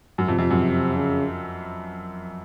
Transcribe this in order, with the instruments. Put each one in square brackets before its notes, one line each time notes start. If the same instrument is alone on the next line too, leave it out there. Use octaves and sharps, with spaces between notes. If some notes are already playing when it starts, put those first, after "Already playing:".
[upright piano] F#2
[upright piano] F2 [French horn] C3
[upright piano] F2
F#2
[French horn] C#3